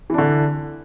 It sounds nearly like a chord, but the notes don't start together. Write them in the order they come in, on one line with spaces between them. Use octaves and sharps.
E3 D4 D3